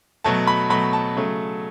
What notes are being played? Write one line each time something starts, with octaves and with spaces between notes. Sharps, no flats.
B2 F#3 A3 A5
B5
B2 F#3 A3 B5
A5
C#3 F#3 A3